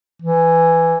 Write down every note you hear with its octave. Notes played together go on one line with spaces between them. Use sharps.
E3